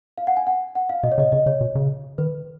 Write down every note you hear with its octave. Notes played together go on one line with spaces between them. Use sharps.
F5
F#5
G#5
F#5
F#5
F5
B2 D#5
C#5
C#3 D#5
C#3 D#5
C#3 C#5
B2
C#3
D#3 B4